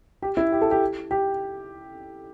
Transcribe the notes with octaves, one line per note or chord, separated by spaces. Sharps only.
G4
E4
G4
A4
G4
G4